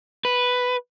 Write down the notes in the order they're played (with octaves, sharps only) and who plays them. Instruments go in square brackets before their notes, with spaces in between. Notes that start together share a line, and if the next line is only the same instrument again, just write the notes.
[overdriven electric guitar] B4